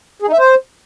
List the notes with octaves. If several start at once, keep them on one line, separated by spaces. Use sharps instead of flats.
G#4
D#4
E5
C5